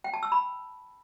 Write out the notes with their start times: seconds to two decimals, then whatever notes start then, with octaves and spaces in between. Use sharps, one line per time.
0.04 G5
0.14 A5
0.23 E6
0.32 B5